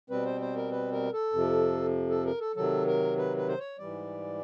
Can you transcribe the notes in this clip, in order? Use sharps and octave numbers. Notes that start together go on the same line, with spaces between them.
B2 G3 C4 B4
C5
C5
A#4
B4
A#4
A4
F2 C3 F3
A4
A#4
A4
C3 D#3 F#3 A4
A#4
B4
B4
C5
C#5
G#2 E3 G3 D5